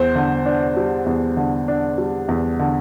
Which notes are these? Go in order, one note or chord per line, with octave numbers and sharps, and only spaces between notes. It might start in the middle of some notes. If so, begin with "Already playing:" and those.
Already playing: E2 C5
D3
D4
G3
E2
D3
D4
G3
E2
D3